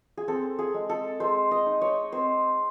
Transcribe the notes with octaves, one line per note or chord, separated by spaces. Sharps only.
G#4
C4 A4
G#4
G#3
A4
G#3 C5
D#5
D#4
C#5
C4 C5